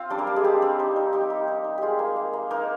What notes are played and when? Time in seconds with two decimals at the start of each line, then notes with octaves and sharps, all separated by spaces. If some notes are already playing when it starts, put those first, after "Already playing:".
Already playing: C4 F4 C5 F5
0.10 G3 D4 D5
0.18 A#3 A#4
0.27 G3
0.36 G#3 G#4
0.44 C4 G4
0.62 C4
0.79 D#4
0.96 D#4
1.13 D#4 G4
1.30 D#4
1.48 D#4
1.64 D#4
1.78 G#3 F4 G4 G#4
1.99 A#3
2.16 A#3
2.33 A#3
2.50 A#3 D#4 A#4